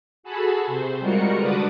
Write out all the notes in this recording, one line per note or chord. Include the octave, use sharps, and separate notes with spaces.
F#4 G#4 A4 G#5 A5 B5
C3 C5
G3 G#3 F4 F#4 A#4 C#7
D3 D4 F#4 B4 D6 D#6